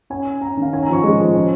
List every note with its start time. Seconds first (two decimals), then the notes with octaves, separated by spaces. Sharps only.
0.10 C#4 G#5
0.26 C#4
0.41 C#4 A#5
0.57 D#3
0.62 F5
0.73 C#4 G#5
0.83 A#5
0.89 F3 C#6
1.04 G#3
1.20 F3
1.35 C#4